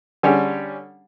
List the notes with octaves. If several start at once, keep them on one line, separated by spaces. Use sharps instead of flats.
D3 G3 C#4 G4 G#4